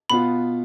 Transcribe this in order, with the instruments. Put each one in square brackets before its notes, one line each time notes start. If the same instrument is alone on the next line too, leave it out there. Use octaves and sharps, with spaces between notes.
[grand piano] B2 B3 F4 [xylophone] B5